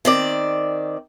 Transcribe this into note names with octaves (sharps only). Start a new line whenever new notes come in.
D#3 C4 D5